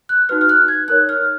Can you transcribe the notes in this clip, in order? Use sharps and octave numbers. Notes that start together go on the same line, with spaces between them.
F#6
D#4 F#4 B4 F6
F6
F#6
G#6
D#4 A#4 C#5 F#6
F6